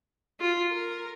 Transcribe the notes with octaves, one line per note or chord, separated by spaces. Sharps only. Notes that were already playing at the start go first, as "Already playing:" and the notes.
F4
A#4